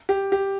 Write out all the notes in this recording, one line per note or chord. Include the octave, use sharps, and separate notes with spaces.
G4
G4